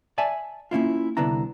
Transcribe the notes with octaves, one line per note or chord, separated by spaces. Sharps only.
D5 E5 G#5 A5
A#3 C#4 E4 F4
C2 D3 B3 D4 E4 A#5